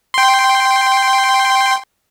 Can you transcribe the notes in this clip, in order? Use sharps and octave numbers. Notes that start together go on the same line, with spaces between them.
G5 C6